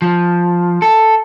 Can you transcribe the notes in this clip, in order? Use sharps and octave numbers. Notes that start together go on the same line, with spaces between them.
F3
A4